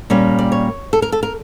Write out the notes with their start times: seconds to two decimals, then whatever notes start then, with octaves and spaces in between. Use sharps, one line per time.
0.10 A#2 G3 A#3 C#4
0.39 D5
0.52 C#5
0.93 A4
1.02 A#4
1.12 A4
1.23 A#4